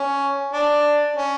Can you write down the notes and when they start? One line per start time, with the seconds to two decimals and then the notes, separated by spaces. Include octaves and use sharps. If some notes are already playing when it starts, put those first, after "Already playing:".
Already playing: C#4
0.53 D4
1.16 C#4